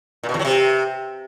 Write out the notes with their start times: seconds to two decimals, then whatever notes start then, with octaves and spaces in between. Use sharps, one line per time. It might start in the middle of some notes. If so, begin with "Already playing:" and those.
0.23 A#2
0.29 B2
0.34 E2
0.39 F#3
0.45 C3